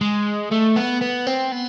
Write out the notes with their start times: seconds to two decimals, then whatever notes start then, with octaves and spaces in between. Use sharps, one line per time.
0.01 G#3
0.52 A3
0.76 B3
1.02 B3
1.27 C4
1.52 B3